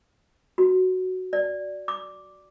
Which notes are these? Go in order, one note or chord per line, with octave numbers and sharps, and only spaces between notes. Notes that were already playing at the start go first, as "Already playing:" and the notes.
F#4
D5
D6